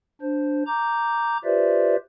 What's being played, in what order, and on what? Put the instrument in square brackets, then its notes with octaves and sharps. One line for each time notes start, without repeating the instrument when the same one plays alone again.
[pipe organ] D4 C5
A#5 D6 G6
F4 G4 B4 C5 D5 E5